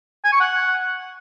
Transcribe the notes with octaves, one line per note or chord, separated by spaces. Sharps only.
G#5
C#6
F#5